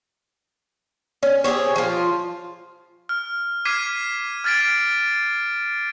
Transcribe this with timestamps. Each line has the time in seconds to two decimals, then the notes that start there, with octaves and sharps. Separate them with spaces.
1.23 C#4
1.44 C4 G4 G#4 C#5
1.76 F3 F4
3.09 F6
3.65 D6 F6 G#6 B6 C7 D#7
4.44 F6 G#6 A6 B6 D7